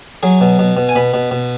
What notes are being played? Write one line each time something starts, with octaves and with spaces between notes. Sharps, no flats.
F#3 G#4
B2
B2
B2
G#5
B2 B5
B2
B2